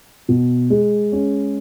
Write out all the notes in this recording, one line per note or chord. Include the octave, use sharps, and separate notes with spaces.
B2
G#3
C#4